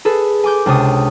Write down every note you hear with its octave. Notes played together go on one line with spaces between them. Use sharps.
G#4 A4 B4
G#5 D6 G6
C#2 C3 D4 D#6